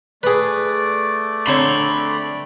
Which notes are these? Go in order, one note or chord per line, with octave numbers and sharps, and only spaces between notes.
A3 G#4 B4 D5
D3 C4 C#5 B5 C6